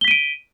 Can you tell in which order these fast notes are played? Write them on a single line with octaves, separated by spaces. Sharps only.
G7 B6 D#7 D7